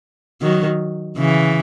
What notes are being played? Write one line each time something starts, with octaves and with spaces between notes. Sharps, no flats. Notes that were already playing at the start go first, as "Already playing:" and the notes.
D#3 F#3
C#3 E3